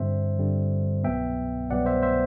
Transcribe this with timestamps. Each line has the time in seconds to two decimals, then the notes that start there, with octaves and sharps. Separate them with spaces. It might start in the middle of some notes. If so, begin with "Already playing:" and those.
Already playing: G2 D3 G3 C4 C5 E5
0.39 G2 D3 G3 C4
1.04 C2 B2 F#3 B3 E5 G5
1.70 C2 B2 F#3 B3 D5 F#5
1.86 C5 E5
2.03 C5 E5